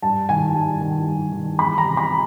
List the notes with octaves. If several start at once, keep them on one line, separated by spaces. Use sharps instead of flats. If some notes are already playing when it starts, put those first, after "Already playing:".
G2 A5
D#3 G#5
G2 A5
D#3
G2
D#3
E2 B5
A#5
C3
B5